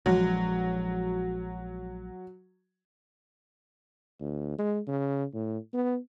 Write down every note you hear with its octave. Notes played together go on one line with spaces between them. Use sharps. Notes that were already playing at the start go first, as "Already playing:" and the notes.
A#1 F3 F#3 G#3
D2
G#3
C#3
A2
B3